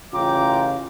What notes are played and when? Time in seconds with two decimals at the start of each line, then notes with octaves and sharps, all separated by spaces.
0.13 A1 C#3 F4 G5 A#5 D6